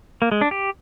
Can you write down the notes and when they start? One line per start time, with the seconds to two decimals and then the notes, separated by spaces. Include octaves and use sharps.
0.22 A#3
0.32 G#3
0.41 D4
0.51 G4